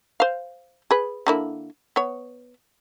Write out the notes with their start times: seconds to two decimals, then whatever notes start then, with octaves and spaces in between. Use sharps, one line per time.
0.20 C5 F5
0.91 G#4 B4
1.27 D3 A#3 E4
1.96 B3 C#5